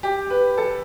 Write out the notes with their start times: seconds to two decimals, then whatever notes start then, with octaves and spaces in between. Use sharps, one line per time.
0.03 G4
0.30 B4
0.58 A4